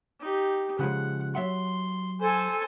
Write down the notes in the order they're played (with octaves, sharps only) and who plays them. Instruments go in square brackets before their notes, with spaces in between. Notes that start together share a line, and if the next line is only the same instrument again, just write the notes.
[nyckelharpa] D#4 G4
[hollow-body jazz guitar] C#3 F3 G#3 [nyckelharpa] F#5
[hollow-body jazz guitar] F#3 E5 F#5 [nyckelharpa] C6
[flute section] A4 G#5 [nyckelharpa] C5 C6